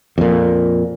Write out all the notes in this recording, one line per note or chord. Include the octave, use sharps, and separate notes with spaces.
F2 A#2